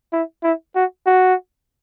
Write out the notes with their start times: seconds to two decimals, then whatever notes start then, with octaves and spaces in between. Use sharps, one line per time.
0.13 E4
0.43 E4
0.75 F#4
1.06 F#4